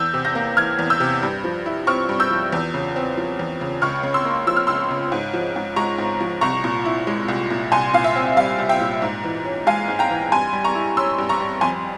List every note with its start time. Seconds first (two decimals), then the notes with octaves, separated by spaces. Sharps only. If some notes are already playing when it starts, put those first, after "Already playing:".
Already playing: E2 E6 G6
0.14 C3
0.25 G6 A#6
0.35 A#3
0.57 E3 F6 G#6
0.79 E2
0.90 E6 G6
1.00 C3
1.23 G2
1.44 F3
1.66 E4
1.87 C4 C#6 F6
2.09 G2
2.20 E6 G6
2.31 F3
2.52 E2
2.74 C#3
2.96 C4
3.17 F3
3.39 E2
3.61 C#3
3.82 C#2 C#6 F6
4.03 C#3
4.14 C6 E6
4.25 A#3
4.47 F3 E6
4.57 F6
4.67 C#2 C6 E6
4.91 C#3
5.12 G#2
5.34 F3
5.56 G#2
5.76 G#3 A#5 C#6
5.98 G#2
6.21 F3
6.41 C2 A#5 C#6
6.64 A#2
6.85 E4
7.07 G#3
7.28 C2
7.50 A#2
7.72 C2 G#5 C6
7.94 A#2 F5
8.04 E5
8.16 C4
8.36 G3 F5
8.58 C2
8.69 E5 G5
8.81 A#2
9.02 G#2
9.24 E3
9.45 C#4
9.67 G#3 F5 G#5
9.88 G#2
9.99 G5 A#5
10.10 E3
10.32 G2 G#5 C6
10.53 G3
10.64 A#5 C#6
10.75 E4
10.97 C#4 C6 E6
11.18 G2
11.29 A#5 C#6
11.40 G3
11.61 F2 G#5 C6